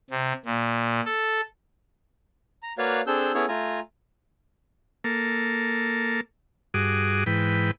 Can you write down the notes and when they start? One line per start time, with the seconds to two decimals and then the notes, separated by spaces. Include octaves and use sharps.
0.10 C3
0.45 A#2
1.05 A4
2.63 A#5
2.78 A#3 F#4 B4 C#5 D5 F5
3.07 C4 D4 G#4 A4 E6 G6
3.34 B3 C#4 E4 G#4 A4 C#5
3.48 A3 F4 G#5 A#5
5.04 A#3 A4
6.74 G2 F#4 G#4 D6 D#6
7.26 G#2 E3 B4 G5